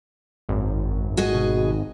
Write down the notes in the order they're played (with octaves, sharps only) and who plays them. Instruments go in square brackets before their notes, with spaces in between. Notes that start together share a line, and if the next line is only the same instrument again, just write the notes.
[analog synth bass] G#1 [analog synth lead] F#2
[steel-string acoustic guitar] F#4 G#4 D#5
[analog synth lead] B2